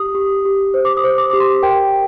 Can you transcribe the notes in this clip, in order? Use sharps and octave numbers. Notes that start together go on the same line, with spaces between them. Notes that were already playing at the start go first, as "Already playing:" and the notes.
Already playing: G4 D#6
G4
G4
C5
D6
D#6
C5
D6
G4 D6
C6
A#4 G5